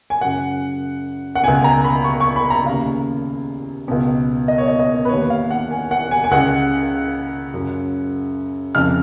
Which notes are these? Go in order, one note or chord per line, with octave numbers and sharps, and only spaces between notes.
G#5
F#2 C#3 F#5
F#5
C#2 B2 G#5
A#5
B5
C#6
C#6
B5
A#5
D#2 C#3 F5
C#2 B2
D#5
C#5
D#5
D#5
B4
D#2 D#3 C#5
F5
F#5
G#5
F#5
G#5
G#5
C#2 C#3 F#5
F#2 C#3
F2 C#3 F6